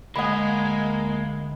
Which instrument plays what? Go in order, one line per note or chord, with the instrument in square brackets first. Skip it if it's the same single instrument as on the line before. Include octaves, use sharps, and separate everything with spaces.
[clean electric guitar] D2 D#5 [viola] G#3 [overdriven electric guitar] A#3 [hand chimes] F#5 B5